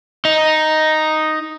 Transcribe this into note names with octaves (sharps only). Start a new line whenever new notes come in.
D#4